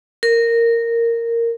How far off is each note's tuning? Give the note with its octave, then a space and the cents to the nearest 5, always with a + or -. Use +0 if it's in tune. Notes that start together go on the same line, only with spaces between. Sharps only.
A#4 -10